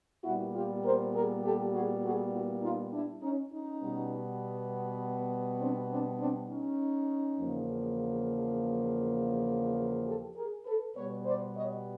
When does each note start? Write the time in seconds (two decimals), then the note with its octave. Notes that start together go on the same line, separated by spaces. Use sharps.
0.24 A#2 G3 B3 E4 F#4
0.54 F4 G4
0.84 A#4 C5
1.14 G#4 A#4
1.43 G4 A4
1.73 F#4 G#4
2.03 F#4 G#4
2.33 E4 F#4
2.62 D#4 F4
2.92 D4 E4
3.22 C#4 D#4
3.51 C#4 D#4
3.82 B2 G3 B3
5.60 C4 D4
5.90 C4 D4
6.19 C4 D4
6.49 C#4 D#4
7.39 E2 C#3 F3 A#3
10.06 G4 A4
10.36 G#4 A#4
10.65 A4 B4
10.95 B2 G3 B3 B4 C#5
11.25 C5 D5
11.55 C#5 D#5